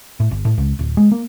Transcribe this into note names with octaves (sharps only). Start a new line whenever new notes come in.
A2
G1
A2
C#2
D1
G#3
A#3